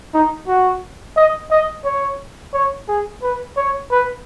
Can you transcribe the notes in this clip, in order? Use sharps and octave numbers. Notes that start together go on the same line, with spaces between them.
D#4
F#4
D#5
D#5
C#5
C#5
G#4
B4
C#5
B4